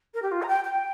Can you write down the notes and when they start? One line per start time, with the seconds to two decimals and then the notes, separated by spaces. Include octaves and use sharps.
0.14 A#4
0.22 G4
0.31 F4
0.42 A#5
0.48 G5
0.64 G5